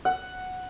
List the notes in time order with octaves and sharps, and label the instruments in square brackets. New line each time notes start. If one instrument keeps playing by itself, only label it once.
[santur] F#5